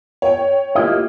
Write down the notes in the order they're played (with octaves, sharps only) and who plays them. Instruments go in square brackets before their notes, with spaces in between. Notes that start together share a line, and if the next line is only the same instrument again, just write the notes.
[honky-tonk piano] C#5 G5
[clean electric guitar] A#3 E4 D#5 [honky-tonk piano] F4 G4